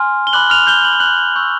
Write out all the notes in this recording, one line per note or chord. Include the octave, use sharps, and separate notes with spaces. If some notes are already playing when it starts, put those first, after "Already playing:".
Already playing: G#5 C6 F6
G7
B5 D6 F#6 F#7
F6 F7
G6 G7
B5 D6 F#6 F#7
G7
F#6 F#7
C#6 E6 G6